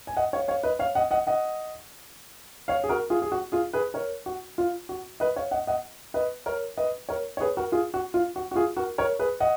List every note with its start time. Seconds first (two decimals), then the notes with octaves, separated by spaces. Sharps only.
0.07 G#5
0.17 D#5 F#5
0.33 C#5 F5
0.48 C#5 F5
0.63 B4 D#5
0.79 C#5 F5
0.95 D#5 F#5
1.11 D#5 F#5
1.27 D#5 F#5
2.68 C#5 F5
2.84 G#4
2.89 F#4 A#4
3.10 F4 G#4
3.22 G#4
3.32 F#4
3.52 F4 G#4
3.73 G#4 B4
3.94 A#4 C#5
4.26 F#4
4.58 F4
4.89 F#4
5.20 B4 D#5
5.36 C#5 F5
5.51 D#5 F#5
5.67 D#5 F#5
6.14 B4 D#5
6.46 A#4 C#5
6.77 B4 D#5
7.09 A#4 C#5
7.37 C#5
7.41 G#4 B4
7.57 F#4 A#4
7.72 F4 G#4
7.94 F#4
8.14 F4
8.36 F#4
8.51 F#4
8.55 F4 G#4
8.77 F#4 A#4
8.98 A#4 C#5
9.19 G#4 B4
9.40 D#5 F#5